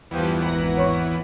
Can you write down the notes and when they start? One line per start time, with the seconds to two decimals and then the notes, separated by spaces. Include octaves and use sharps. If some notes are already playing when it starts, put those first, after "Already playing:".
0.11 E2 G2 E3 F3 G3 B3
0.43 G#1 F#5 A#5
0.77 C#5 C#6